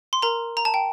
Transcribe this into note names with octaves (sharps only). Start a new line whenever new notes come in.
C6
A#4 A#5
A#5
A5
G5